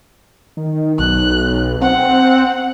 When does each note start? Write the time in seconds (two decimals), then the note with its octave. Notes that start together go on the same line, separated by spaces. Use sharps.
0.57 D#3
0.99 B1 F#6
1.82 C4 F#5